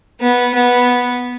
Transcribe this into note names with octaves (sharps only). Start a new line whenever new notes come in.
B3
B3